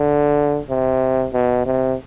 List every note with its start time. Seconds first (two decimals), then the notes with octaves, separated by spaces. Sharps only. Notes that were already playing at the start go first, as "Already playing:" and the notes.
Already playing: D3
0.70 C3
1.33 B2
1.66 C3